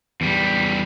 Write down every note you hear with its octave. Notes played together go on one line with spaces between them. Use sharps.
E2 G3